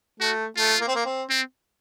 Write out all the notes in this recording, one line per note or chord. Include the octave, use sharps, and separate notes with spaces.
A3 F#4
A3 F4
A#3
C4
A#3
C4
C4